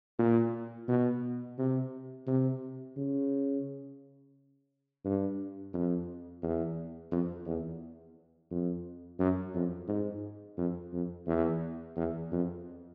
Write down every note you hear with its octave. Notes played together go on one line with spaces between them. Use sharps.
A#2
B2
C3
C3
C#3
G2
F2
E2
F2
E2
F2
F#2
F2
G#2
F2
F2
E2
E2
F2